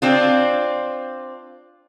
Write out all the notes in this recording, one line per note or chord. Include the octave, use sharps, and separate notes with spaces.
C4 D4 F4